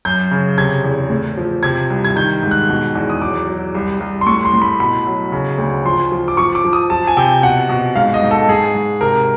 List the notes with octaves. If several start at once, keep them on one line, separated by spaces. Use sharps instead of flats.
F#2 G6
C#3
C3 G#6
E2
A2
F3
C3 G#6
C2
G#6
D#3 G6
G#2
F#6
B2
E2
D#6
F#3 D6
F#3
C2
C2
C6
A2 C#6
C6
A2
B5
B2 B5
F#3
C#3
D2
F3 C6
F3
D6
F3 C#6
D6
F3
D#6
F3 A5
G#5
C3 G5
B2 F#5
B2
G#2 F5
D#5
G#2
A4
G#2 G#4
G#2
C3 A#4